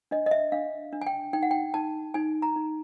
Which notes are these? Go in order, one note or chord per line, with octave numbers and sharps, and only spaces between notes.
D4 D#5
D#5
E5
D4 F5
D4
G#5
G5
D#4 G5
F#5
G5
D#4 A5
D#4 G#5
A#5
D#4